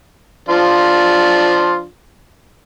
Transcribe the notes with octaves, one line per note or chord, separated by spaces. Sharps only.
F3 D4 F4